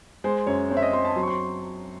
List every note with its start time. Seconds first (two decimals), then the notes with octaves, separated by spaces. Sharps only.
0.24 G#3 C5
0.47 F#2 C#5
0.70 C4 C#5
0.77 E5
0.82 D#5
0.93 C4 C6
1.05 A5
1.16 F#3 C6
1.23 C#6
1.28 C6